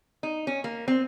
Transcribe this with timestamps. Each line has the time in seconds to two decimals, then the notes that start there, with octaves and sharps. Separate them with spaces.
0.23 D#4
0.47 C#4
0.64 A#3
0.88 C4